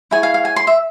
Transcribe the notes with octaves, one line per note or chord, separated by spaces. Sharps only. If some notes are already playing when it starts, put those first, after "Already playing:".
E4 G#4 C#5 G#5
F5
F5
G#5
C6
E5